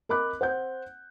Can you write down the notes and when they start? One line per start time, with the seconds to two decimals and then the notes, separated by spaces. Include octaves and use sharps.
0.09 A#4 D#5 B5 D6 F#6
0.41 C5 F#5 G6